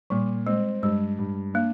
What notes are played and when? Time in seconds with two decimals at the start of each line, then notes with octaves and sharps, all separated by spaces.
0.10 A#2 G3
0.46 G#3 C4
0.82 G2 G#3
1.18 G2
1.54 A#3 D4